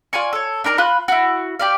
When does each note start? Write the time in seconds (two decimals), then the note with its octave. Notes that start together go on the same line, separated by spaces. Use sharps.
0.13 F4 D5 G#5 C#6
0.33 A4 C#5
0.64 D4 D#4 A#4 A#5
0.78 F4 B5 F#6
1.08 E4 F#4
1.59 G4 D5 F5